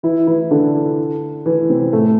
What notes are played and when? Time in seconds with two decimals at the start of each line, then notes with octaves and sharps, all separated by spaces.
0.03 E3 E4
0.27 E3 E4
0.51 D3 D4
1.46 E3
1.70 C3 C4
1.93 A2 A3